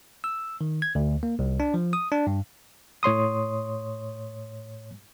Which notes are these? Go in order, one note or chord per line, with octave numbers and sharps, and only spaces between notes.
E6
D#3
G#6
D2
A#3
C2
D4
F3
D#6
D4
G2
A2 C#5 C6 D#6